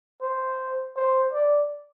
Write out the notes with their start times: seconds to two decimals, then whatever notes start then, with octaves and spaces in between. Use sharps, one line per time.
0.22 C5
0.96 C5
1.33 D5